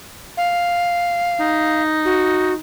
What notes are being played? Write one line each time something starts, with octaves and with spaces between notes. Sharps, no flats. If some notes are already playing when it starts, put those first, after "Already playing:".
F5
D#4
F#4